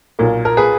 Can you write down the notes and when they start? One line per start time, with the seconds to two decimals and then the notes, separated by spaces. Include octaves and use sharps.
0.19 B1 A#2 A#3
0.45 A#4
0.57 G#4 B4